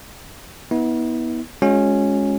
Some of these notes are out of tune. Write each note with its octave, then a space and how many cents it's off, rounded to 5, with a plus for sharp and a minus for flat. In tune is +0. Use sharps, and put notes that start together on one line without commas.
B3 -15 E4 -45
G#3 +0 C#4 -5 F#4 -45